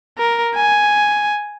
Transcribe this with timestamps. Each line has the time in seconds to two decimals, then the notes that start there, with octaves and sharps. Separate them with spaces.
0.19 A#4
0.55 G#5